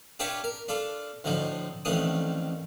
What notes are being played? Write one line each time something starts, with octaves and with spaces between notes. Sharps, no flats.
D4 F4 G4 B4 C#5 E5
A#4
D4 F4 A4
D2 A2 D3 F3 D#4
A1 F2 D#3 A3 D4 D#6